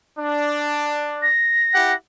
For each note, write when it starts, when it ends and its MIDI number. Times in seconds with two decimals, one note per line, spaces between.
0.18 1.27 62
1.22 1.95 94
1.73 1.93 64
1.73 1.93 67
1.73 1.93 78